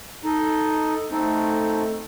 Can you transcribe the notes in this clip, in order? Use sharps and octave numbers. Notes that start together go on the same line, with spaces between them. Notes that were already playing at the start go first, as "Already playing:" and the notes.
D#4 A4 D#5
A3 C4 D#4 A4